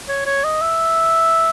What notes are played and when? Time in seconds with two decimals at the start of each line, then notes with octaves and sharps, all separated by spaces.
0.08 C#5
0.26 C#5
0.44 D#5
0.62 E5